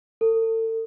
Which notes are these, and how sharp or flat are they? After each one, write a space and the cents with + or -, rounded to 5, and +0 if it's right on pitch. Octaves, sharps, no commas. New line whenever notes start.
A4 +35